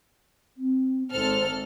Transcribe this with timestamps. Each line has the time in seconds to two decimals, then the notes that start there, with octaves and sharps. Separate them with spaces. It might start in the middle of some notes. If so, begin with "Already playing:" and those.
0.57 C4
1.11 G#1 A4 C5 F6